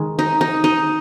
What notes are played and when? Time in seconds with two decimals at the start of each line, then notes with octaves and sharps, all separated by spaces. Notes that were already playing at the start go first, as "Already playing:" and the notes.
Already playing: D#3 G#3
0.19 D#4
0.41 D#4
0.64 D#4